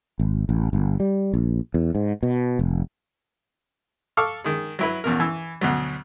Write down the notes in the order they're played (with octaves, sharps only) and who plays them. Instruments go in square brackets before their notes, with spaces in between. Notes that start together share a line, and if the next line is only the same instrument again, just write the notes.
[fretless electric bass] G#1
A1
G1
G3
A#1
E2
G#2
B2
F1
[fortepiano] A4 F5 C#6 D6 E6 F6
D#3 G#3
F#3 E4 B4
A1 E2 B2 A#4
E3 E6
D2 B2 F#3